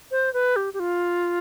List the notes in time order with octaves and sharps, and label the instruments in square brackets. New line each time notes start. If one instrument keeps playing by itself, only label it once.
[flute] C5
B4
G4
G4
F4